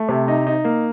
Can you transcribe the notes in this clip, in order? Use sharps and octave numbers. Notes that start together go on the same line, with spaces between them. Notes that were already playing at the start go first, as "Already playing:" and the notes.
Already playing: A3
C3
D#4
D#4
A#3